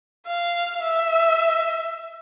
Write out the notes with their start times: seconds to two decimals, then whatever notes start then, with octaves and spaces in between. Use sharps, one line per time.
0.27 F5
0.82 E5